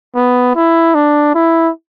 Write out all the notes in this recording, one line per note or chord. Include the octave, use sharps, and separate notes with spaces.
B3
E4
D4
E4